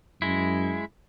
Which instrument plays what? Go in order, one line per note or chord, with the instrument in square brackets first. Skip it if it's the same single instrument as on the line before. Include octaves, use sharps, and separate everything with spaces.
[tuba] F#2 [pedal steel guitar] G#3 E4